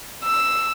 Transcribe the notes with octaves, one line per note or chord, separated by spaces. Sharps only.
E6